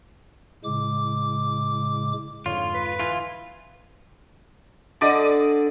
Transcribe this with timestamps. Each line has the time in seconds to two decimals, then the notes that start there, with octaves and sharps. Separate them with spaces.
0.64 A2 C#3 G#3 D6
2.46 F2 G#2 D3 F4 C#5
2.74 B4
2.99 E3 F4
5.01 D3 D5 D#5 D6